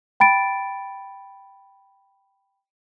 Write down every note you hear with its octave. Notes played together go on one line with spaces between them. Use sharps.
G5 B5 A6 D7